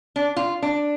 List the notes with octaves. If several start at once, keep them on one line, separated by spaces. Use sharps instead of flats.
D4
F4
D4